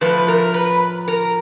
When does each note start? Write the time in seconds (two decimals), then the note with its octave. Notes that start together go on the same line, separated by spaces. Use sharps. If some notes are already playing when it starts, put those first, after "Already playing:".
0.01 A2 F3 A3 B4
0.28 A#4
0.54 B4
1.08 A#4